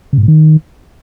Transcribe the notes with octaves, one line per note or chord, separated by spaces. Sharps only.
C#3
G#2
A2
D#3